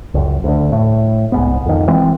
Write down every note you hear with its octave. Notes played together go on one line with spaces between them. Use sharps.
C#2 F#2
D2 D3
A2
C2 G#2 B3
F2 D#3
E3 G#3 C4